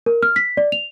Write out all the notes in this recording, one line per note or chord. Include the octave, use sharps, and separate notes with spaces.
A#4
F6
B6
D5
F7